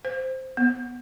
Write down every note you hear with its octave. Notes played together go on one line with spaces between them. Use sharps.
C5
B3